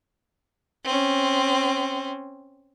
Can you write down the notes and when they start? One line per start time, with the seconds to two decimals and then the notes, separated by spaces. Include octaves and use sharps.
0.84 C4 C#4